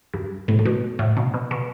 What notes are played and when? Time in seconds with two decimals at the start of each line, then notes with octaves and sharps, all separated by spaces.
0.14 G2
0.48 A2
0.59 A2
0.65 B2
0.99 A2
1.17 B2
1.34 B2
1.51 B2